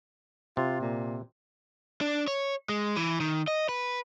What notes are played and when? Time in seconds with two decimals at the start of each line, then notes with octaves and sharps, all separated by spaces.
0.57 C3 F4
0.81 A#2
2.01 D4
2.28 C#5
2.69 G#3
2.96 E3
3.20 D#3
3.48 D#5
3.69 B4